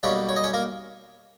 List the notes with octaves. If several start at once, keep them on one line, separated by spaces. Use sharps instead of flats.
B1 B2 G3 A#3 C#4 C#5
C#5
D#5
C#4 C#5
A#3 A#4